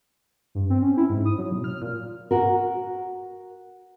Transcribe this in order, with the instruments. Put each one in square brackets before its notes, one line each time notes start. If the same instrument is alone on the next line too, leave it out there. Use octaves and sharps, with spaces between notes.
[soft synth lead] G2
C4
C#4
E4
G#2
D#6
F#3
B2
F6
A#2
[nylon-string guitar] F#4 A#4